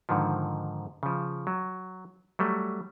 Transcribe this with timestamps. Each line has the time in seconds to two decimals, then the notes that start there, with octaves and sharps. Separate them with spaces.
0.09 G#2 D3 D#3 F3
1.03 C#3 F3
1.47 F#3
2.39 F#3 G3 A3